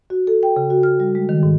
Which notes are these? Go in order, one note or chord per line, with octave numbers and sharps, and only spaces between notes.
F#4
A4
G5
C#3
F#4
F6
G3
G#3
D#3
G#2